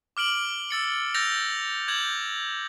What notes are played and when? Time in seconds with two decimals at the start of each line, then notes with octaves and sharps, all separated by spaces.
0.17 D6 F6 D7 F#7
0.71 E6 A6 C#7
1.14 E6 G6 A6 A#6 F7
1.88 D6 G6 G#6 F#7